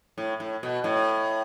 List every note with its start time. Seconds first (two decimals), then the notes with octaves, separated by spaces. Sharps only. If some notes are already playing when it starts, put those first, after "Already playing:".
0.18 A2
0.40 A2
0.63 B2
0.84 A2